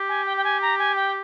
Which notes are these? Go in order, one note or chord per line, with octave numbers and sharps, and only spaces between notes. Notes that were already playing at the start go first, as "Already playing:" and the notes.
Already playing: G4
G#5
G5
G5
G#5
A#5
G#5
G5